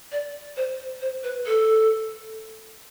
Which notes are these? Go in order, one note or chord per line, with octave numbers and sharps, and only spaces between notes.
D5
C5
C5
B4
A4